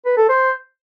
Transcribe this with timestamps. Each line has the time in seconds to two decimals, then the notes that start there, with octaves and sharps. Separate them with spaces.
0.05 B4
0.17 A4
0.29 C5